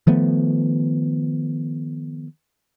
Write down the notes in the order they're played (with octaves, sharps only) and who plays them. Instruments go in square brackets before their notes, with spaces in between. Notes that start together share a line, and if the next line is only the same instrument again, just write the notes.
[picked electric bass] D#3 F3 A3 B3